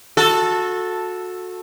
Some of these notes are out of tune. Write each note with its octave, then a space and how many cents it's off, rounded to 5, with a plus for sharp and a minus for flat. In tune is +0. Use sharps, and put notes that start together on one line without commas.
F#4 -25 A4 +0